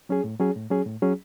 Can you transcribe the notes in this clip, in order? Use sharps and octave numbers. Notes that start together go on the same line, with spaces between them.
F#3 C#4 G#4
A2
F#3 C#4 G#4
A2
F#3 C#4 G#4
A2
F#3 C#4 G#4